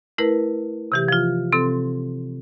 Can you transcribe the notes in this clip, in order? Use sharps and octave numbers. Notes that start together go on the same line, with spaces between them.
A3 E4 A#4 B4
C3 E3 G4
F3 F4
C3 C4 A4 C6